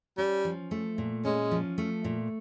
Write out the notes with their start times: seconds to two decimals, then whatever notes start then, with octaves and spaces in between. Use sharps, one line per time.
0.18 G3 C#4
0.45 F3
0.71 A3
0.98 A#2
1.25 G#3 C#4
1.51 F3
1.78 A3
2.04 A#2